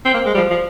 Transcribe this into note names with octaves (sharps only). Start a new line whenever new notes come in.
C4
A#3 C5
G#3
G3
F3
F3